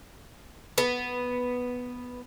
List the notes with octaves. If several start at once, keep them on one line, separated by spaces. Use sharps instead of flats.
B3